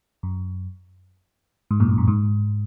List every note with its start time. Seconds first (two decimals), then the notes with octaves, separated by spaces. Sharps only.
0.23 F#2
1.71 G#2
1.80 F#2 A#2
1.89 G#2
1.98 F#2
2.08 G#2